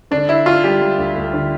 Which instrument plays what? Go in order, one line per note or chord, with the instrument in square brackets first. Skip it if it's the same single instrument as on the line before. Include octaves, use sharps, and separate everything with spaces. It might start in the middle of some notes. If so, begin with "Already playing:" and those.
[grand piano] D3 [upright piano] D4
[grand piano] D3 [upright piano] E4
[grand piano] D3 [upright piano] F4
[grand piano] G3 [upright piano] G4
[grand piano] G3
D2
D2
D3